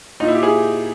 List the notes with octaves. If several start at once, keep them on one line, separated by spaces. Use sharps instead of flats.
A#2 D#4
E4
G4
E4 G#4